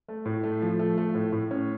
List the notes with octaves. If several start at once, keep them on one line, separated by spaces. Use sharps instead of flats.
A3
A2
A3
F3
A3
A3
A2
A2
C#4